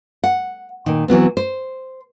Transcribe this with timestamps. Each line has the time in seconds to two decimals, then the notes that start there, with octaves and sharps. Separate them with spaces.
0.24 F#5
0.86 A#2 D#3
1.08 E3 F#3 B3 C4
1.37 C5